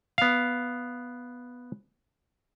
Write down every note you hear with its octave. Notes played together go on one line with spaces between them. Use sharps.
B3 F5